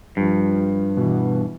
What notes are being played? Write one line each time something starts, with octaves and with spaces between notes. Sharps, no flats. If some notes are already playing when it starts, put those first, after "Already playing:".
G2 F3
B2 E3